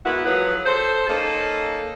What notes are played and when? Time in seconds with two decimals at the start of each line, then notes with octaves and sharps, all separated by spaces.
0.06 G#3 A#3 B3 E4 F#4
0.26 F3 F#3 G#4 B4
0.66 A4 C5
1.07 A#3 C#4 D#4 A4